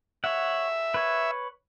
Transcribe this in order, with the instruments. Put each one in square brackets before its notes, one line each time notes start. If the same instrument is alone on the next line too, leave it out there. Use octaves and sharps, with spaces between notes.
[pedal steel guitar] C#5 F#5 [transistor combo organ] E5
[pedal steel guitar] B4 C#5